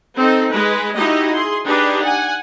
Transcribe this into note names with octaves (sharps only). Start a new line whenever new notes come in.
C4 D#4 A4
G#3 B4
D#4 E4 F#4 G4 D#5
G#4 C6
D4 D#4 G4 G#4 B4
F#5 G#5